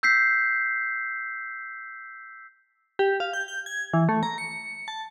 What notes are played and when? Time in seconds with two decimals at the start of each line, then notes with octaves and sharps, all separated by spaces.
0.03 E6 G6 B6 C7
2.99 G4
3.20 F5
3.33 G6
3.48 G6
3.66 G#6
3.94 E3
4.09 A3
4.23 A#5
4.38 C#7
4.88 A5